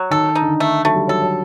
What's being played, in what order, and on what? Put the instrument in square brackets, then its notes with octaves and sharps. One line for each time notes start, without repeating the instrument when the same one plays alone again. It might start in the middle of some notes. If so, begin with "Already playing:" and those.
Already playing: [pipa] F#3
[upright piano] D#3 [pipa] A4
[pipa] D#4
[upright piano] D3
D#3
[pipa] A3
[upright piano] F#3 [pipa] A3
[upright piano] G3
[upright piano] F#3 [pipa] A4
[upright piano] F#3